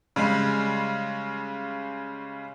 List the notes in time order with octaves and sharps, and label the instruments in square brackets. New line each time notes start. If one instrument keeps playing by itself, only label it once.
[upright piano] C#3 G3 G#3